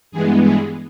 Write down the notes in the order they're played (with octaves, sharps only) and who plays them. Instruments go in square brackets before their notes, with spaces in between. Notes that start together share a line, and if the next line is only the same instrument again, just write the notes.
[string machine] G2 E3 G#3 B3 G#4
G#4